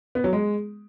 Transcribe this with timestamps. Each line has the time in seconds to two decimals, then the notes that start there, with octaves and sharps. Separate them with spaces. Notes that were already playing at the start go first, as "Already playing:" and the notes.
0.15 B3
0.24 F#3
0.33 G#3